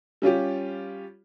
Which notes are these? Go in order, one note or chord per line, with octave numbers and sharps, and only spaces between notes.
G3 C#4 F4 G4